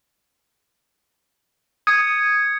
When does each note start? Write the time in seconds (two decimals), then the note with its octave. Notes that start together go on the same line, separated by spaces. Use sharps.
1.87 D#6 G#6 C#7